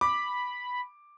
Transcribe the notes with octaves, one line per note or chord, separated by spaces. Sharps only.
B5 D6